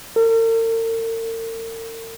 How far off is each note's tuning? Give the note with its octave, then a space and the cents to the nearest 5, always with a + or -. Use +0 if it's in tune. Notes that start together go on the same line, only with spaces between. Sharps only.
A#4 -45